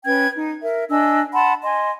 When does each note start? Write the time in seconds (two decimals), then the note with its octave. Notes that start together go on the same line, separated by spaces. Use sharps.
0.05 C#4 B4 G5 G#6
0.35 D#4
0.62 A#4 E5
0.90 D4 D#5 G#5 E6
1.33 F#5 A5 B5 C6
1.63 D#5 G#5 C6